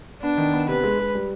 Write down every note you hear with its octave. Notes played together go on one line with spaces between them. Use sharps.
B3 D4
D#3
B3
C3 B4
G#3
G#3
G3